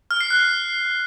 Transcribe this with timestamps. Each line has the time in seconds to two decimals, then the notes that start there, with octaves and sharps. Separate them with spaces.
0.11 F6
0.21 C7
0.30 F#6